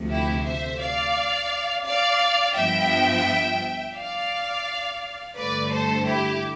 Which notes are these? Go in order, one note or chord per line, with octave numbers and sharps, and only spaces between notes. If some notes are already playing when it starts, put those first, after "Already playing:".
Already playing: D2 C3 F3 A3
E4 G4
C5 E5
D5 F5
D5 F5
G2 F3 B3 E5 G5
D5 F5
G2 D3 A3 B4 D5
A4 C5
E4 G4